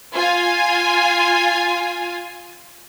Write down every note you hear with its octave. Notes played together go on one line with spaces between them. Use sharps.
F4 G#5